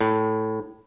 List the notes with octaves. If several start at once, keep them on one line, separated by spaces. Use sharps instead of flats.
A2